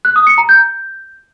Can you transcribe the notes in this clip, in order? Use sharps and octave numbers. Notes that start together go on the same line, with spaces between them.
F#6
D#6
C#7
A#5
G6